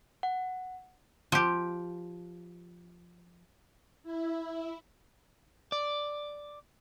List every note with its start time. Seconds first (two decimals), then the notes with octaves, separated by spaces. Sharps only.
0.23 F#5
1.32 F3 G4
4.03 E4
5.72 D5